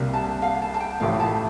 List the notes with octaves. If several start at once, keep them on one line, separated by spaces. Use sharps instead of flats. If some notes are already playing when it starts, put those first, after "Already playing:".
Already playing: C2 C3 G3 A#3
A5
F5
A5
A5
G5
A1 A2 F3 A3 F5
A5